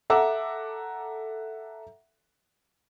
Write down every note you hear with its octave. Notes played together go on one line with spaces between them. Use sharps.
A4 E5 F#5 A#5 D6 E6